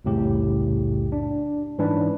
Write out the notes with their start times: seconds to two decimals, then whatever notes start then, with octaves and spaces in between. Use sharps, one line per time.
0.05 C2 F2 A2 C#3 G4
1.12 D4
1.78 G#2 E3 C#4 D4 B4